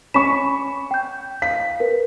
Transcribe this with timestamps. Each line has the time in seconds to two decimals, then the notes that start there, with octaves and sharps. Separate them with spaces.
0.14 C#4 B5 C#6 B6 E7
0.91 G5 G6
1.42 F5 B6
1.80 A#4 B4